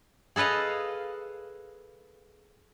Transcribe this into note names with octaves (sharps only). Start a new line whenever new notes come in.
G#4 A4 B4 D#5 F5